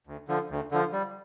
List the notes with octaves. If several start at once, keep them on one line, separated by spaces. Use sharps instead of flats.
D2
D3 F3
D2
D3 F3
G3